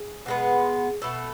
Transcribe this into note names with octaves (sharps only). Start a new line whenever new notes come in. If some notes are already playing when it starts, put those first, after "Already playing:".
Already playing: G#4
B2 G#3 B3
B2 A3 A4